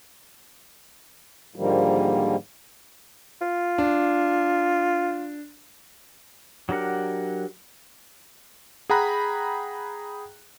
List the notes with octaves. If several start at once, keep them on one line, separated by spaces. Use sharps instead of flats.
G#2 D3 D#3 F3 G3 A#3
F4
D4
F#3 D4 G4 A#4 F#5
G#4 F#5 G5 A#5 B5 F#6